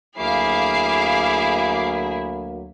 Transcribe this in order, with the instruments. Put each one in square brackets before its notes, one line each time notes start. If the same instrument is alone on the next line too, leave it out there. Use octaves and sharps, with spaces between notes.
[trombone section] D2 F#3 A#3 [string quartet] E4 G#4 [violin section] F5 D6 C7